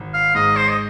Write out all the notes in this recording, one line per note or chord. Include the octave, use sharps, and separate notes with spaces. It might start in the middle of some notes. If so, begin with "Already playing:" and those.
Already playing: G#1
F5
G#2 D#5
C5
D#5